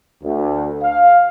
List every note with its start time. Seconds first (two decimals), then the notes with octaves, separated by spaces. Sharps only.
0.23 D2
0.83 F5